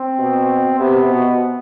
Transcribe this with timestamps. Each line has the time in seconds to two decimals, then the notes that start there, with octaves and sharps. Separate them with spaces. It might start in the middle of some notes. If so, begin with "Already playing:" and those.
Already playing: C4
0.19 B2
0.79 C3 B3
1.09 B2